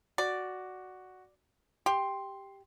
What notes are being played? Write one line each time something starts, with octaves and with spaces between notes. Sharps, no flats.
F#4 D5
G4 C6